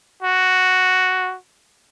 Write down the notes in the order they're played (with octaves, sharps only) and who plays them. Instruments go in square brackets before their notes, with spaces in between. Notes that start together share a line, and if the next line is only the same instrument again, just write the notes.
[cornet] F#4